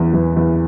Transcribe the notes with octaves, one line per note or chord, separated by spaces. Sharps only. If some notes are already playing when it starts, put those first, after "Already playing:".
Already playing: E2 E3
E2
E2